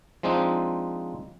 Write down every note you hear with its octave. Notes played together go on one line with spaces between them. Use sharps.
F3 G#3 C4 D4 D#4